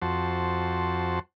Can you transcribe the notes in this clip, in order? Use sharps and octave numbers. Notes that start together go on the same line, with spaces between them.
F2 F#4 C5 A5